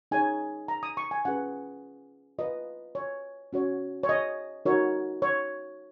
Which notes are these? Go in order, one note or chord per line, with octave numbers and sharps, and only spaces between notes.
D#4 G#4 C#5 G#5
A#5
D#6
C#6
G#5
C#4 F4 G#4 B4 F#5
F4 B4 D#5
C#5
C#4 F#4 C#5
C#5
D#5
D#4 F#4 A#4 C#5
C#5